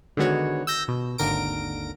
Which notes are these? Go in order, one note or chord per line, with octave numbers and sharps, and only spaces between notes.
D3 D#3 G#3 B3 F#4 C#5
E6 G6 A#6
B2
G#1 D#2 D3 A#4 A#6 D7